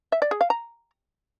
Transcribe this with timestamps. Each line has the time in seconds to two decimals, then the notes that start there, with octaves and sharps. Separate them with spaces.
0.12 E5
0.22 D5
0.31 G#4
0.41 F5
0.50 A#5